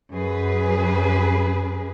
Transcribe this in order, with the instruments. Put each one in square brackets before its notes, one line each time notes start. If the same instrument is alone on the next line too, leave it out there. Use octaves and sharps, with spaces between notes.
[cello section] F#2 G#4 B4